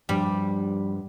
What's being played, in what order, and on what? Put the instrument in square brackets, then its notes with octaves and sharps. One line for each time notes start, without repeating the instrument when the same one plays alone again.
[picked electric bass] G2 F3 D4 [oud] G3